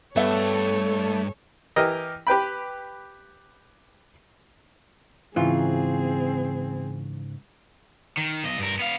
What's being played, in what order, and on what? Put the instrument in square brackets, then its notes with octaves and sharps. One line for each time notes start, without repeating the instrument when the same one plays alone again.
[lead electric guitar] G2 [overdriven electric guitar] A3 [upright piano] B3 E5 [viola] A4 C#5
[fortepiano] E3 G4 A#4 D#5
G4 B4 G5 B5
[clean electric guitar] G#2 C#3 [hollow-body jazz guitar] E3 F4 [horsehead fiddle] C4 G#4
[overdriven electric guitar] D#3
B1 D#5
G2 A#4
B3 F5